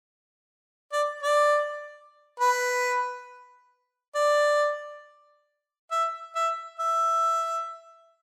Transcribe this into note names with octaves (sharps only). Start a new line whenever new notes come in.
D5
D5
B4
D5
E5
E5
E5